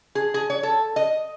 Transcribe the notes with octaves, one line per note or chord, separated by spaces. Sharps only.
G#4
G#4
C#5
A4
D#5